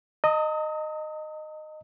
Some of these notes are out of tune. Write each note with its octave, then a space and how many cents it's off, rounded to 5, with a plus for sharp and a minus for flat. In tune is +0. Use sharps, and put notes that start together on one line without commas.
D#5 -15 A#5 -45 D#6 +35